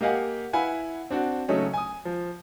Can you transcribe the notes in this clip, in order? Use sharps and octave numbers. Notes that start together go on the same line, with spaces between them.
A#3 G4 D#5 F5 F#5 G#5
E4 B4 F5 F#5 G#5 B5
C4 D4 F#4
C#3 F#3 A3 C#4 D#4
G#5 D#6
F3